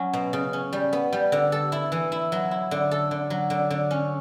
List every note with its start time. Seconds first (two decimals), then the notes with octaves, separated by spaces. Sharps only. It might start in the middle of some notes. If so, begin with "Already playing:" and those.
Already playing: F#3 C#4
0.13 B2
0.33 C#3
0.53 C#4
0.73 G3
0.93 B3
1.13 G3
1.32 D3
1.52 A4
1.72 E4
1.92 E3
2.12 E4
2.32 F#3
2.51 E4
2.71 D3
2.91 A4
3.11 D3
3.30 F#3
3.50 D3
3.70 D3
3.91 C#4